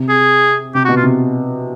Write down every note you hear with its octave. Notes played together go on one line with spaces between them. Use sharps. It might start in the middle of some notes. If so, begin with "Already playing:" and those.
Already playing: C3
G#4
C3 G4
F#4
B2
F4
C3